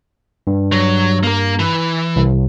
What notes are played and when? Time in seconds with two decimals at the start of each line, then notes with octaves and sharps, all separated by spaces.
0.47 G2
0.72 F#3
1.23 A#3 A#4
1.59 E3
2.16 C2